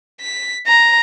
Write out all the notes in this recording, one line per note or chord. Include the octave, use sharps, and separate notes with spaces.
B6
A#5